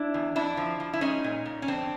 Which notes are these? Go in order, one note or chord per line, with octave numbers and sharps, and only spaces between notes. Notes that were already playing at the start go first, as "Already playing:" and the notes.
Already playing: D4 E4
E2
F2 D4 E4
F3
F3
E4
G#3 C#4 D#4
A#2
A#2
C#4
F2 C4 D4